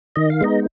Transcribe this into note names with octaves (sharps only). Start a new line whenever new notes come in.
D#3 D#5
F5
G#3 B3 D#4 D#5